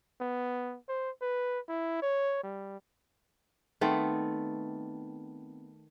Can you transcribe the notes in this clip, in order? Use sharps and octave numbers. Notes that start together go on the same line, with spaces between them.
B3
C5
B4
E4
C#5
G3
D#3 A3 B3 C4